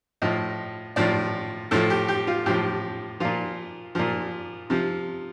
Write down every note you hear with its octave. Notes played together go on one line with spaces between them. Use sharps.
A2 F3 D#5
A2 F3 D5
A2 F3 A4
G4
G4
F4
A2 F3 G4
A#2 F3 F4
A#2 F3
C3 F3